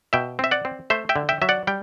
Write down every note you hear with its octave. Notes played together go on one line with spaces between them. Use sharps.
B2 E5 G5
C4 E5
D5 F#5
C4
A3 C5 E5
E5 G5
D3
E5 G5
F#3 E5
D5 F#5
G3 G5